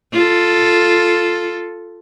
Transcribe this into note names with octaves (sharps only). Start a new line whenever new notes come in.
F4 A4